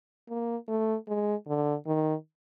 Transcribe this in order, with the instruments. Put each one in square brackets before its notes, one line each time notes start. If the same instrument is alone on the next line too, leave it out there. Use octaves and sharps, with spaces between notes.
[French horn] A#3
A3
G#3
D3
D#3